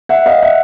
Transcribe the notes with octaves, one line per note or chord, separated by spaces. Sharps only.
E5 F#5
D#5 F5
E5 F#5